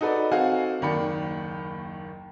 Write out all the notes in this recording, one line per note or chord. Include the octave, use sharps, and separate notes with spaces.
D#4 F#4 A4 B4 D5
C4 D#4 F#4 A4 F5 G#5
F#1 D#2 D#3 D5 B5 C#7